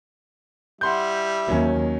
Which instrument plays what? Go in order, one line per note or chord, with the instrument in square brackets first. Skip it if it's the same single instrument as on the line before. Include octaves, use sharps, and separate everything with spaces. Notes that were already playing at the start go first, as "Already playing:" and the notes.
[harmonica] G3 E4 [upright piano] F#5 C6 G6
[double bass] D#2 [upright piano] F#3 C#4